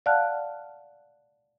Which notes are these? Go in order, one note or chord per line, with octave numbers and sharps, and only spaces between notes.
D5 F5 F#5 A5 F6 F#6